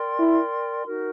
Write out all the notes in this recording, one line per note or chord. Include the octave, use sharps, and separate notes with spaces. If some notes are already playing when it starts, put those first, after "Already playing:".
Already playing: A#4 D5 G5 C6
E4
D#4 F#4 A#4